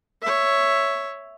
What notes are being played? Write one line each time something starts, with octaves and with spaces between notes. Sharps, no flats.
C#5 E5